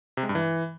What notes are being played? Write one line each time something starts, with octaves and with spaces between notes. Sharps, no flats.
C3
G#3
G2
E3